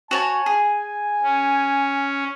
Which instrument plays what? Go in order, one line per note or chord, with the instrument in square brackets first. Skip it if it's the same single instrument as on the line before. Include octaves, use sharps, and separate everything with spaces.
[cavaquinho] F#4 C#5 A5 [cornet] G#5
[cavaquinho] G#4
[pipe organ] C#4